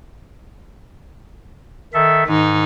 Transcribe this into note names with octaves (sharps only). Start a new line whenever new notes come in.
D#3 A4 E5
G#2 D#3 D#4